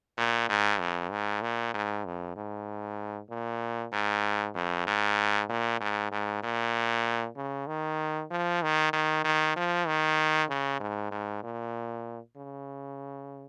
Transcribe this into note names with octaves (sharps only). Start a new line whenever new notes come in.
A#2
G#2
F2
G#2
A#2
G#2
F2
G#2
A#2
G#2
F2
G#2
A#2
G#2
G#2
A#2
C#3
D#3
F3
D#3
D#3
D#3
F3
D#3
C#3
G#2
G#2
A#2
C#3